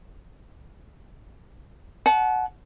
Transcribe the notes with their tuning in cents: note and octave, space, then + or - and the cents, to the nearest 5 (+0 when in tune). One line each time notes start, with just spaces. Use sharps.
F#5 +0 A5 -35